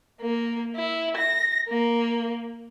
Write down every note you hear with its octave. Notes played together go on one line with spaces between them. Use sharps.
A#3
E4
A#6
A#3